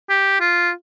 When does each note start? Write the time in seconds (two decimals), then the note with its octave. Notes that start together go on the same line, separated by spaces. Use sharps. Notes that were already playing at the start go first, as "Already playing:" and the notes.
0.09 G4
0.40 F4